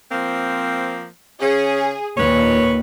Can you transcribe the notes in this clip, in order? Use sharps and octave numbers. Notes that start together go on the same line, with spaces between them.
F3 A#3 C4
C#3 C#4 G#4
D#2 A#2 B4 C#5